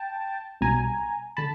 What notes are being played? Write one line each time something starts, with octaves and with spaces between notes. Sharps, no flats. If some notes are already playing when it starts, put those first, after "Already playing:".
Already playing: G5 A5
B1 B2 G3 G#5 A#5
D3 A5 B5